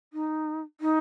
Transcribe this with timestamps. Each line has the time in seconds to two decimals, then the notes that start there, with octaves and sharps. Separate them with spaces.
0.13 D#4
0.81 D#4